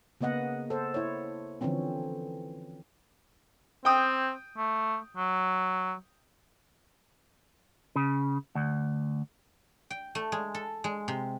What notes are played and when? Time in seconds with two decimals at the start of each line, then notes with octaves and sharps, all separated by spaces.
0.21 C#3 A#3 B3 D#5 F#5
0.70 A4 C5
0.94 E4 C#5
1.61 D3 E3 F3 C4 C#4
3.85 C4 G5 D#6
4.58 A3
5.17 F#3
7.96 C#3
8.55 D2
9.90 G5
10.15 A3
10.32 G#3
10.54 A4
10.84 G#3
11.08 C3